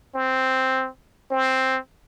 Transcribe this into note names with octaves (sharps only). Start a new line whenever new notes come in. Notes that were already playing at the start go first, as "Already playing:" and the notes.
C4
C4